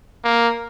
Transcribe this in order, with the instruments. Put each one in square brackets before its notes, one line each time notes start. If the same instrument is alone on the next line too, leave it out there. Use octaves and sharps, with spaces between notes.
[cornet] A#3